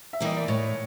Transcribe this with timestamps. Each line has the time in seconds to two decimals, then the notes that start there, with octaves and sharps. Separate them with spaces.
0.13 E5
0.20 E3 G3 A#3 D#5
0.37 D5
0.48 A2 C#5